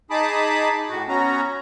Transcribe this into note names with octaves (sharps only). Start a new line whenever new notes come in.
D#4 G#4 A5 B5 D6 D#6
A2 F#4
B3 C#4 F#4 A#5